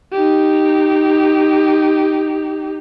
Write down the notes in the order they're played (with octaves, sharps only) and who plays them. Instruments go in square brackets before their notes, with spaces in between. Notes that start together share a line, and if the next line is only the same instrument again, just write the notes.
[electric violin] D#4 G4